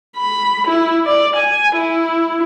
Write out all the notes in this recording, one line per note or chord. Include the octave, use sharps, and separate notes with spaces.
B5
E4
D5
G#5
E4